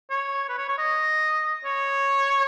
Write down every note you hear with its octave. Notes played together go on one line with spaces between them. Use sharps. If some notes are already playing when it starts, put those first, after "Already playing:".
C#5
B4
C#5
C#5
D#5
C#5